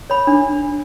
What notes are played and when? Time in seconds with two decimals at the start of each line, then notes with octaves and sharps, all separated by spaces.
0.10 C#5 B5
0.27 D4